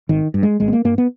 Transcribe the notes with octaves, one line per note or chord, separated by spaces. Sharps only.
G#1 D#3
G2
G#3
G#1 G#3
B3
A#3
G2 A#3
B3